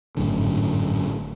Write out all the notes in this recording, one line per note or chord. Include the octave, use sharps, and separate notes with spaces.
G#1 F#2 A2 D3